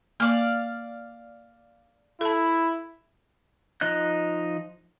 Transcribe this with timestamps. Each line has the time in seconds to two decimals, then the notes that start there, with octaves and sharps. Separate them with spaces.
0.20 A#3 D5 F5 D6
2.21 E4 A4 A5
3.81 F3 D#4 D#5 F#6